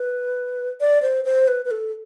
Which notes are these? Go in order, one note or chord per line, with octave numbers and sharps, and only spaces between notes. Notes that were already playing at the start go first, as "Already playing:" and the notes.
Already playing: B4
D5
C5
C5
B4
B4
A4